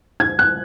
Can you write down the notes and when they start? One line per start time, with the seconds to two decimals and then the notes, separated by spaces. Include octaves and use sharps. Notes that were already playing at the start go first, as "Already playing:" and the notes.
0.20 G#6
0.39 F#6